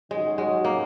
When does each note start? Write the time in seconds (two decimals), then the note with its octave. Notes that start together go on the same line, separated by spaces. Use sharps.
0.11 D#3 F#3 G#3 C#4 F#4
0.38 G#3
0.64 A#3